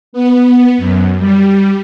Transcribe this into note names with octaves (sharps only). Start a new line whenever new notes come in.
B3
F#2
G3